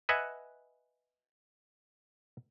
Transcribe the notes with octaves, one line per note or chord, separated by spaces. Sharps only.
B4 D#5 E5 F#5 G#5